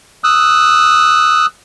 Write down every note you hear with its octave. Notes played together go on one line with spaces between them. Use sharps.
D#6 E6 F#6